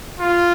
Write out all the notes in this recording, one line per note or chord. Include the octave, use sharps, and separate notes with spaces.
F4